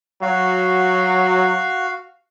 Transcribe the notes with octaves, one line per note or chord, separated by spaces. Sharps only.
F#3 F#4 F5